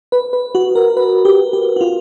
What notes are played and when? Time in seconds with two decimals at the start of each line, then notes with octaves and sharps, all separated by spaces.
0.12 B4
0.33 B4
0.55 F#4
0.75 A#4
0.97 B4
1.25 G4
1.53 G4
1.76 F#4
1.81 F4